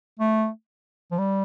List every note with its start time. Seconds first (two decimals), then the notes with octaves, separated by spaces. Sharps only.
0.19 A3
1.11 F3
1.18 G3